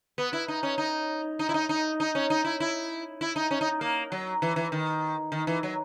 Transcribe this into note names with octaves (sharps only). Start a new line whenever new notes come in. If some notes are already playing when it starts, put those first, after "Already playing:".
B3
E4
D#4
C#4
D#4
D#4
E4
D#4
D#4
D#4
C#4
D#4
E4
E4
E4
D#4
C#4
D#4
A#3
F#3
E3
E3
D#3
D#3
E3
F#3